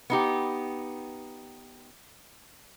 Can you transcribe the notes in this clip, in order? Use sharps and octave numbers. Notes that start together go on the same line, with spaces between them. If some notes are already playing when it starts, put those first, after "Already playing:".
B3 D#4 G4